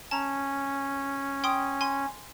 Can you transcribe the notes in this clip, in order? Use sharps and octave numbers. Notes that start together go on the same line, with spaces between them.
C#4 A5 A#5
G5 C6 D#6
G#5 C6